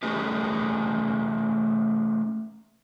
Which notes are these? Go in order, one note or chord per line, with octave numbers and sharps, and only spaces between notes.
A3 C#4 D#4 G4 G#4